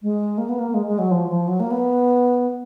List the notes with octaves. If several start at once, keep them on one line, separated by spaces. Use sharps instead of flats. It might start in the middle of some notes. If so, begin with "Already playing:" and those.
G#3
A#3
B3
A#3
G#3
G#3
F#3
F3
F3
F#3
A#3
B3